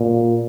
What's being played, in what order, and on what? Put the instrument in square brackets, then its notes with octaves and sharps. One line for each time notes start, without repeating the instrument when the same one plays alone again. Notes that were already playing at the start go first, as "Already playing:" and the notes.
Already playing: [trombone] A#2